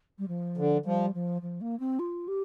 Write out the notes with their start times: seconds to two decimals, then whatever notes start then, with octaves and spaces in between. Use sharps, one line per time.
0.19 G3
0.28 F3
0.58 D3
0.85 F3 G3
1.14 F3
1.42 F3
1.61 A#3
1.80 C4
1.99 F4
2.28 G4